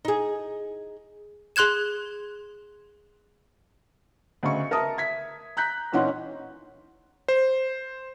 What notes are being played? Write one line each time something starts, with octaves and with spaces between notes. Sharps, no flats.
D#4 G#4
G#4 C6 F#6 G#6 E7
D2 C#3 D#5 E5 C#6 C#7
A#4 E5 A5 D#6
E5 G#6 B6
A#5 F#6 G6 B6
A#2 E3 C#4 D#4 F#5 C6
C5